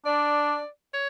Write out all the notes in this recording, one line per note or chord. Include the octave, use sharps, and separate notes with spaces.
D4 D5
C#5